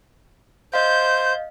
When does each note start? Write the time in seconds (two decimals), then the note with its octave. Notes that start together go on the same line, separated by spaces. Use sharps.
0.74 C5 D#5 F5 G6